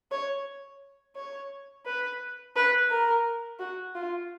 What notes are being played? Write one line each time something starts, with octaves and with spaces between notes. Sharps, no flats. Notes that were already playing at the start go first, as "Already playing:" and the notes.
C#5
C#5
B4
B4
A#4
F#4
F4